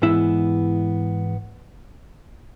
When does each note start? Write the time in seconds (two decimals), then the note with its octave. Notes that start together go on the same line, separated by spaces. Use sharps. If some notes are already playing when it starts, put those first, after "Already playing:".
0.02 G#2 E3 G#3 B3 E4